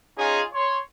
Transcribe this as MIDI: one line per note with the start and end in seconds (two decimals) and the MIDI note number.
0.17 0.41 61
0.17 0.41 63
0.17 0.41 65
0.17 0.41 68
0.53 0.77 73
0.53 0.77 84